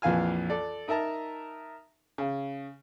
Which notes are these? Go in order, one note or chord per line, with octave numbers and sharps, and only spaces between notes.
A#1 F2 E3 F5 G#5 F6
A4 D5
D#4 A#4 E5 A5 A#5
C#3